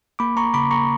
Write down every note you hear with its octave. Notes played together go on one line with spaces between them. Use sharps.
A#3 B5 D6
A#3 A#5 C#6
C#3 B5 D6
A#3 A#5 C#6